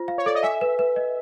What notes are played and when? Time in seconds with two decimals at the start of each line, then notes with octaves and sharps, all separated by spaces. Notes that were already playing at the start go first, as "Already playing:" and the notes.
Already playing: F4 C5
0.08 F5
0.18 C#5
0.26 A4 D5
0.35 D#5
0.43 E5 G#5
0.61 B4
0.79 B4
0.96 D#5